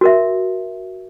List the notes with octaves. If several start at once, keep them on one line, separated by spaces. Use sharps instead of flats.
F#4 A#4 E5